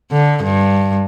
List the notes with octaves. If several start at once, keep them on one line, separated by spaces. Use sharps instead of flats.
D3
G2